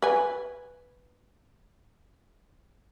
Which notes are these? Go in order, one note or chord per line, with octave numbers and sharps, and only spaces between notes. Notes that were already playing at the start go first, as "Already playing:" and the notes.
B4 G#5